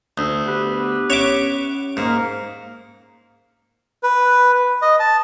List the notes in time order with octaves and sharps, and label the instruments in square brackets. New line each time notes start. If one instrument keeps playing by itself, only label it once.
[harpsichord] D2 [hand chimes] D#6 E6
[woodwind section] B3 G4 B4
[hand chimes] C#4 [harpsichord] C#5 E5 D6
[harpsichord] G#2 [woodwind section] A#3
[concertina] B4
D#5
A5